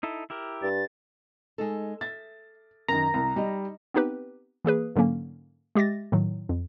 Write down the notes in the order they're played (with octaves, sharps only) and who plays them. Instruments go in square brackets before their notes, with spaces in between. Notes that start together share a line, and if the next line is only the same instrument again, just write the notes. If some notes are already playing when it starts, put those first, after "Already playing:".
[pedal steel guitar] D#4 E4 A4
E4 G4 A#4
[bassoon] G2 [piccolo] A6
[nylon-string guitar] G#3 D#4 A4
[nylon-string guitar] E5 [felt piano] A6
[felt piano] F#2 D#3 [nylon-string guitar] A#4 [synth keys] A#5
[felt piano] C2
[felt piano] G3 [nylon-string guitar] D#4 D#5
[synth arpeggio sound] B3 C4 D#4 G4 B4
E3 A#3 G#4 B4
G#2 D3 F#3 A#3 C#4
G#3 G4 E5 A6 A#6
A2 D#3 F#3
F2